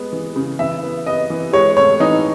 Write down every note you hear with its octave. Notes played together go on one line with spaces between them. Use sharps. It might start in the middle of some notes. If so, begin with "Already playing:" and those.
Already playing: G#3 B3
E3
C#3
E3 E5
B3
B3 D#5
E3
G#3 C#5
A2 C#5
E3 D#4